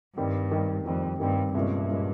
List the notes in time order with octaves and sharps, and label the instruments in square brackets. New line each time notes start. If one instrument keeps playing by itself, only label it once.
[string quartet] G2 [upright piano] D#3 G3 C4
[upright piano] D#3 G3 C4
[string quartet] F2 [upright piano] D#3 G3 C4
[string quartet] G2 [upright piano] D#3 G3 C4
[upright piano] C2 A#2 G#3 C#4 [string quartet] G2
[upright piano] A#2 G#3 C#4